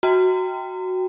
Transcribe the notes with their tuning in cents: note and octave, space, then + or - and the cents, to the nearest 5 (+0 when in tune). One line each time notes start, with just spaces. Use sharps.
F#4 +0 G5 +0 A#5 -25